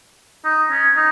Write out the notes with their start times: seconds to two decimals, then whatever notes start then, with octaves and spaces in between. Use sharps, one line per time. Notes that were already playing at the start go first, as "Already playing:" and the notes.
0.45 D#4
0.71 C#4
0.96 D#4